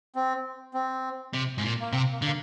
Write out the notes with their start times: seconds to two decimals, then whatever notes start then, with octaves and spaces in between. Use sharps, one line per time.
0.15 C4
0.74 C4
1.33 C3
1.58 G#2
1.64 A#2
1.81 A#3
1.92 C3 C4
2.12 A#3
2.22 D3
2.26 A#3